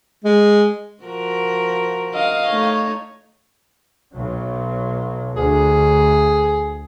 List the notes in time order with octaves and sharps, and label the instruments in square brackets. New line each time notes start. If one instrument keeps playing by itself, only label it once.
[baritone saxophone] G#3
[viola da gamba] F3 F#4 A#4
[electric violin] D#5 F5
[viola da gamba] A3 D#4 C#5
[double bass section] B1 F#3
[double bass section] D2 [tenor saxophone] G#4